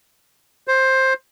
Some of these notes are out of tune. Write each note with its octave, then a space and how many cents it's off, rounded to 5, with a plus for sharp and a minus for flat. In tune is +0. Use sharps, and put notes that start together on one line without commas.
C5 +10